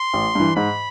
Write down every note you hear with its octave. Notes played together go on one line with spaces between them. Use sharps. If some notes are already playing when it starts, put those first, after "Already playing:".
Already playing: C6
A1
G2 E3
G#2 B5